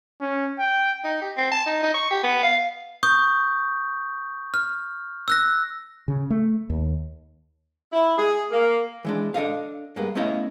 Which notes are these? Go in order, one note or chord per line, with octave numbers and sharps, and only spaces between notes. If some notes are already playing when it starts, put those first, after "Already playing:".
C#4
G5
D#4
G4
C4
A5
D#4
D#4
C#6
G4
B3
F5
C#6 D#6 G6
F6
E6 F#6 A#6
C#3
A3
D#2
E4
G#4
A#3
E3 G#3 D4
D4 A4 D#5 F5
G2 G#3 A#3 B3
A3 B3 C#4 E4 D#5 F5